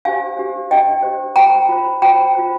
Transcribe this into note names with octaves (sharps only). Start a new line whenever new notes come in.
D4 G4 C5 F5 G#5
D4 G4 C5
D4 G4 C5 D#5 G5
D4 G4 C5
F4 C5 G5 A#5
F4 C5
F4 C5 G5 A#5
F4 C5